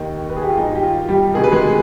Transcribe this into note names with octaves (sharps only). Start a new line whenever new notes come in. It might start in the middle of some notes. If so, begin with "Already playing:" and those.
Already playing: D#2 D#3
B4
G#4
G4
F4
G#1 G2 D#3 D#4
G4
F4
G3 G4
D2 C3 D#3 G#4
B4
G#3 G#4